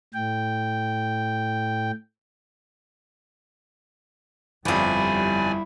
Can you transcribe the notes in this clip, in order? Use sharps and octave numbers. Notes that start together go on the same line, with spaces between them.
A2 G5
G1 F2 G3 E4 D5 F5 G#5